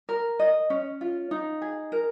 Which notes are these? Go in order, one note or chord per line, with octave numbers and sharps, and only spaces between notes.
A#4
D#5
C#4
F4
D#4
G#4
A#4